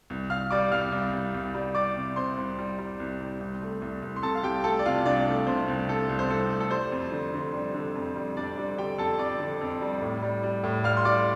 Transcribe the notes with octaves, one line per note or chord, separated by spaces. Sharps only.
C2
C2 F5 F6
G3 D5 D6
C2 F5 F6
C2
C2
C2
G3
G3 D5 D6
C3
C3 C5 C6
C2
G3
G3
C2
G3
C2
A3
C2
C2
C6
C3 A4 A5
F5
C2 G4 G5
A3 A4 A5
D5
C3 F4 F5
C2 D4 D5
A3
C3 C5
C2
C3 A4
C2
C5
C2 A4
A3
A4
G3 C5
F2
D3
D3
G3
D3
F2
G3
F2 D4 D5
G3
D3 G4 G5
F2 A4 A5
F2 D5 D6
D3
F2
G3
A2
G3
G3
A2
G3 F5 F6
C6
G3 D5 D6